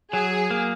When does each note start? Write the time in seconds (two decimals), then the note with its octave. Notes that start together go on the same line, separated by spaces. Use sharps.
0.13 F#3 G#4
0.51 A#3